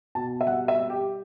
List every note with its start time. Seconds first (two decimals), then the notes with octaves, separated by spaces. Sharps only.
0.15 B2 A5
0.41 E5
0.47 G3 F#5
0.68 E5
0.79 G3
0.90 G4